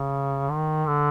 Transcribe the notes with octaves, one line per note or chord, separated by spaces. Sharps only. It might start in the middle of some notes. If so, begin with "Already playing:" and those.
Already playing: C#3
D#3
D3